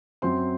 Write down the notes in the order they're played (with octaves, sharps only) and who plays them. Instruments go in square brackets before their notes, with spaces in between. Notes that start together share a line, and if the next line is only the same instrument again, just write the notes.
[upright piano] F#2 F#3 C4 C5 C6